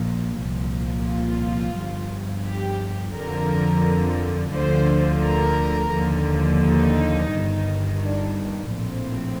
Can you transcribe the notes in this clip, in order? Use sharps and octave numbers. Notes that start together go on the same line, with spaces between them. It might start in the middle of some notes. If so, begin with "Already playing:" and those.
Already playing: A#1 A#2 F3
C2 A#2 F3
F4
G1 G2 F3
G4
F2 D3 F3 A#4
D2 D3 F3 C5
A#4
D#2 D3 F3
D#4
G1 G2 D#3
D4
A#1 A2 F3 C4